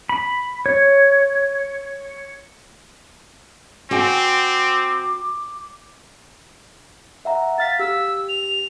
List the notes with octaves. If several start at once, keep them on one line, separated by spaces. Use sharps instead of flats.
B5
C#5
C4 F#4 G5 G#5 D6
E5 F#5 A#5
F5 F6 A6 B6
G4 E6
F7